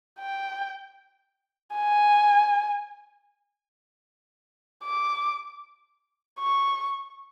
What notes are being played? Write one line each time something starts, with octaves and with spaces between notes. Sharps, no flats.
G5
G#5
D6
C#6